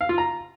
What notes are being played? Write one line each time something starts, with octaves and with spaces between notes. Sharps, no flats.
F5
F4
A#5